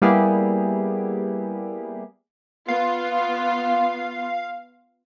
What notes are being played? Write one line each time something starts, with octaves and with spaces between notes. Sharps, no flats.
G3 A#3 B3 E4 G4 G#4
B3 F4 F5